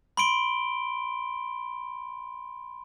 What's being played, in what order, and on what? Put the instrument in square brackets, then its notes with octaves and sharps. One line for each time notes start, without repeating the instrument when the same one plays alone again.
[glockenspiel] B5 C6 D7 G7